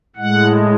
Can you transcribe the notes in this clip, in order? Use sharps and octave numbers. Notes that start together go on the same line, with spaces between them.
A2 G#3 F#5